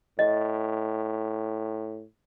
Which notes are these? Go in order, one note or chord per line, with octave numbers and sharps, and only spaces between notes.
A2 D#5